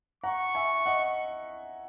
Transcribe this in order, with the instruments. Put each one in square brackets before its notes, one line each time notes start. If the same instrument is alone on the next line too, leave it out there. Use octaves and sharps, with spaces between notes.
[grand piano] F#5 A#5 [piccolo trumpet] C#6
[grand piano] E5 G#5
D#5 F#5